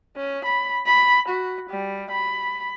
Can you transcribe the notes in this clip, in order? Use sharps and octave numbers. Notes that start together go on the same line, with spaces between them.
C#4
B5
B5
F#4
G3
B5